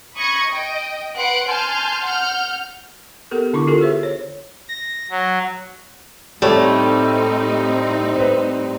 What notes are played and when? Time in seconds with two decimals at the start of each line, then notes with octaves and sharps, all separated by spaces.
0.16 B5 C#6 D#6 G#6 A#6 C#7
0.49 D#5 G5
1.17 B4 F#5 C6 F#6 D7
1.48 G#5 A5 C6 F6 G6
2.05 F#5 F6 G6
3.31 B3 G4 A4 A#4
3.53 D3 D4 E4 C#6 D6
3.67 F4 G4 A4 A#4
3.81 G#4 C5 E5
4.03 C#5
4.69 A#6
5.10 F#3
6.42 A2 G3 A3 C4 D#4 G4 C#5
8.16 B4 C5